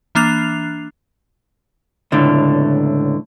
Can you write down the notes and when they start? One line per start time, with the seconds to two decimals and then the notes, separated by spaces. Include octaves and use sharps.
0.15 E3 A#3 D4 F#6 C7 F7
2.12 C#2 A2 D3